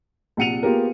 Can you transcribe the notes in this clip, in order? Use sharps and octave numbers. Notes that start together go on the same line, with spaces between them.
A#1 C3 F#5 C#7 D#7 F7
A#3 B3 F4 G4 G#4 A#4